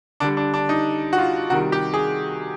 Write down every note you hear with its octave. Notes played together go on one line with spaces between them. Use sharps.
D3 G3 D4
D4
D4
D#4
F#4
F4
C3 D#3 G3 F#4
G4
G#4